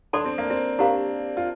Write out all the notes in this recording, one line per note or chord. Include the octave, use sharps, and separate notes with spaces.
D4 A4 D5 A5 C6
C4
A#3
C4
D4 G4 A#4 F5 A#5
F4